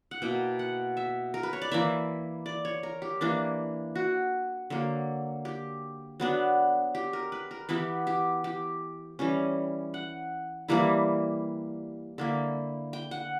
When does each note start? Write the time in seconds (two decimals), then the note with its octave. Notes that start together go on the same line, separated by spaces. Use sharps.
0.11 F#5
0.22 B2 A#3 E4 G5
0.59 F#5
0.97 E5
1.34 A#4
1.43 B4
1.53 C#5
1.62 D5
1.72 E3 A#3 E4 E5
2.46 D5
2.65 C#5
2.83 A#4
3.02 G4
3.21 E3 A#3 D4
3.95 F#4
4.70 D3 F#3 A#3
5.45 G4
6.20 F#3 B3 D4
6.95 G4
7.13 A#4
7.32 B4
7.51 A#4
7.69 E3 B3 E4 G4
8.07 G4
8.44 G4
9.19 E3 G3 C#4
9.94 F#5
10.68 E3 G3 A#3 E4
12.18 D3 A#3 E4
12.93 G5
13.11 F#5